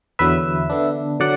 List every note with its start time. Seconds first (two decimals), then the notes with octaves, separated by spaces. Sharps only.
0.19 E2 D3 F#3 B4 E5
0.70 D3 B3 D4
1.20 D3 F#3 D5 F#5